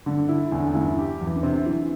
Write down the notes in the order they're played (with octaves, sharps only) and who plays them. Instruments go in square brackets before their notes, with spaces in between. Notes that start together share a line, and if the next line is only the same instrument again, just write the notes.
[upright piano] G2 [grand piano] D3
[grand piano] E4
[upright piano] E2 [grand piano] D3
[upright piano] E2
[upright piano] G2 [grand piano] E4
[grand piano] G4
E2
[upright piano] E3
D3
[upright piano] C3 [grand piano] C4
[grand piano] E3